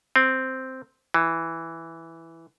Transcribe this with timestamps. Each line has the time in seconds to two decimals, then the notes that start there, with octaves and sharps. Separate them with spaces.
0.16 C4
1.14 E3